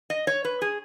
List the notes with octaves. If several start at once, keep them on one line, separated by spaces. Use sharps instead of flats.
D#5
C#5
B4
G#4